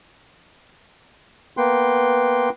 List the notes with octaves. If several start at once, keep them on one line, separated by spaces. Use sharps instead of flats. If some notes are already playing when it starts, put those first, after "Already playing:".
A#3 B3 B4 G5 C6